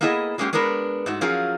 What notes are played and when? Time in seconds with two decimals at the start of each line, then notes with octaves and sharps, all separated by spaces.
0.01 A#3 B3 E4 G#4 A4 D#5
0.38 F#3 G#3 A#3 C#4 G4
0.53 G#3 B3 D4 A#4 B4
1.06 G#2 A3 F#4
1.21 F3 F#3 C#4 F4 G#4 A#4